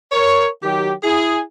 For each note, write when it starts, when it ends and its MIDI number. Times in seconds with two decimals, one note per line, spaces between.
0.12 0.48 70
0.12 0.48 73
0.63 0.92 51
0.63 0.92 54
0.63 0.92 67
1.04 1.41 64
1.04 1.41 68